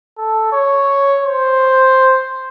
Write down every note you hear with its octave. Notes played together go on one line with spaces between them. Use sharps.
A4
C#5
C5